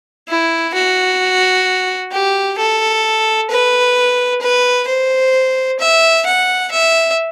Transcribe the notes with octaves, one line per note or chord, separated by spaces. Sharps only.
E4
F#4
G4
A4
B4
B4
C5
E5
F#5
E5